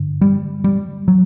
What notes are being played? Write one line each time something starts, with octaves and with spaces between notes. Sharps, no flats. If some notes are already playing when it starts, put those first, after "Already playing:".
Already playing: G2 D3
G3
G3
F#3